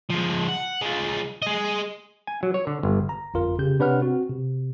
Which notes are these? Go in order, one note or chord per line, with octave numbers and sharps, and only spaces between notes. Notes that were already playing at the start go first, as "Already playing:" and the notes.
F3 G#3
F#5
G#3 F4
G#4 D#5
G#5
F#3
C#5
D3
G1
A#5
G1 F2 F4 A#4
C#3 G4 G6
C3 D4 B4 C#5 F#5 F6
C4 F#4
C3